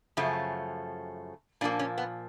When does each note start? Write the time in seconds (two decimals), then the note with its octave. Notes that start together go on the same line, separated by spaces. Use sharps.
0.17 F#2 C#3 F3 A3
1.61 A#2 F3 A#3 D4
1.79 C#4
1.98 B3